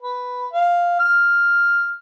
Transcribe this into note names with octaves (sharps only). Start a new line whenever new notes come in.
B4
F5
F6